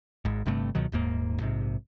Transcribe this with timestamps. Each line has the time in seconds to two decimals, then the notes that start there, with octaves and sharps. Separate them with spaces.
0.25 G#1 G#2
0.46 G1 G2 C3 A3
0.75 C#2 B2 D#3 F#3
0.92 D#1 D#2 G#2 A#3
1.40 A#1 G#2 C3